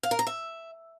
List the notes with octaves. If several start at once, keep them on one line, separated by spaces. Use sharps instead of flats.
F5
A#4
A#5
E5